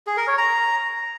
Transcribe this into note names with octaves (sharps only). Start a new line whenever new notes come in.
G#4
A#4
C#5
A#5